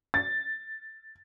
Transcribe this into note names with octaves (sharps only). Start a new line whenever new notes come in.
A6